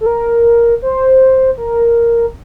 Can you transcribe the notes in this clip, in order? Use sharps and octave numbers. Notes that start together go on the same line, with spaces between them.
A4
A#4
C5
A#4